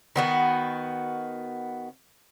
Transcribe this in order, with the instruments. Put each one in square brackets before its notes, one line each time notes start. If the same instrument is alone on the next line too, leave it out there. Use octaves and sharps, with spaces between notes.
[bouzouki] D#3 B3 F#4